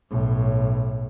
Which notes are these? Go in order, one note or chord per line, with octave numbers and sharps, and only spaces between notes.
B1 A2